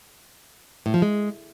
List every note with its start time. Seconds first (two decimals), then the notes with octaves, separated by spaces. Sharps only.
0.86 A2
0.94 F3
1.02 G#3